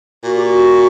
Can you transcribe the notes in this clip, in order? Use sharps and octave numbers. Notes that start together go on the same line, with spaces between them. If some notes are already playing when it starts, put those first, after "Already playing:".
A#2 F#4
G4
F#4